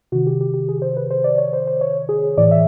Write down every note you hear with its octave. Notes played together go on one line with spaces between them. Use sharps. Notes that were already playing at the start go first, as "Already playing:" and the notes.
C3 D#3 F#4
G4
G4
G4
G#4
C5
B4
C5
D5
C#5
C5
C5
C#5
G#4
A2 E3 D5
E5